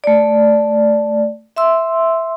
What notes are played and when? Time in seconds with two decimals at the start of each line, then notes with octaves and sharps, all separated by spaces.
0.04 A3 D5
1.56 E5 C6 E6